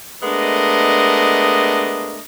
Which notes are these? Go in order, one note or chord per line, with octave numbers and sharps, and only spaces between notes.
G#3 A3 B3 D4 A#4 D#5